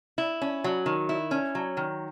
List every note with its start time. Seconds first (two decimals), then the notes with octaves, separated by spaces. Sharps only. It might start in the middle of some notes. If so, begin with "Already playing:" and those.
0.18 E4
0.41 C#4
0.64 F#3
0.86 D#3
1.09 E4
1.31 C#4
1.55 F#3
1.77 D#3